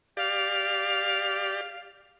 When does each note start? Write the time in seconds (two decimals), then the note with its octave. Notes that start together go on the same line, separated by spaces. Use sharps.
0.17 G4 D5 F5